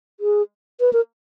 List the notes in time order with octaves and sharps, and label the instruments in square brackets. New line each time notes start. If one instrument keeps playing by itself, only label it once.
[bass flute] G#4
B4
A#4